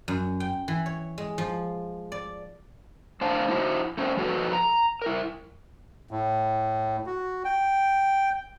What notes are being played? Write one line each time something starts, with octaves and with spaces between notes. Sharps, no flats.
F#2
G5
E3
C#5
G#3
F3
D5
A3 D4 C5 F5 A5
D#4 E4 F#4 C5
A3 C#4 C5
F3 F#4 A4 B4
A#5
E4 A#4
A2
F#4
G5